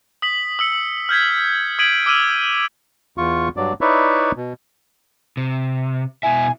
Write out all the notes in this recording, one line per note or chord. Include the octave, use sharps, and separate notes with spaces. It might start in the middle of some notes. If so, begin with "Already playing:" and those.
D#6 B6 F#7
D#6 E6 C#7
F6 G6 G#6 B6
D#6 G#6 B6 D7 D#7 F#7
D6 E6 F6 D#7 F#7
E2 F4 C#6
G2 F#3 D5
D#4 E4 B4 C#5 D5 E5
B2
C3
B2 E4 E5 G#5